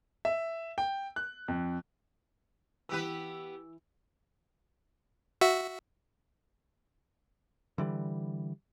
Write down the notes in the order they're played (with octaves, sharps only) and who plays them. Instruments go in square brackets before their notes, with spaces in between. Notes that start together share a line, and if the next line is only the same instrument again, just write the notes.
[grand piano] E5
G5
F#6
F2
[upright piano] E3 E6 [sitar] B3 G4 B4
[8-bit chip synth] F#4 E5
[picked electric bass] D3 E3 G3